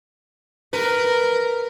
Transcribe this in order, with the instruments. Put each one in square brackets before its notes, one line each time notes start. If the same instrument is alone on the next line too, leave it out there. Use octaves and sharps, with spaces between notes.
[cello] A#4 [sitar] B4